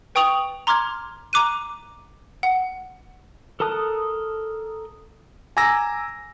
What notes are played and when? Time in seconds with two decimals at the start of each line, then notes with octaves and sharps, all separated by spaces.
0.15 B4 G5 C#6 D#6 F7 F#7
0.67 A#5 C6 D6 F6 G#6
1.33 A#5 D6 F#6 D#7
2.43 F#5
3.60 A4 A#4 A5 D#6 F#6
5.57 G#5 A#5 D6 E6 A#6